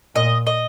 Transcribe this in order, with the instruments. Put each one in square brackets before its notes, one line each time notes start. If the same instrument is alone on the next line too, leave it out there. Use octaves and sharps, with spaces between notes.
[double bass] A#2 [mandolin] D#5
[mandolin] D#5